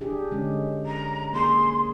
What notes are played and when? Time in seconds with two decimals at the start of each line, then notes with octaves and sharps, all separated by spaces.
0.01 D4 G4 G#4
0.31 D3 G#3 C#4
0.85 A#5
1.33 A#3 G#4 C6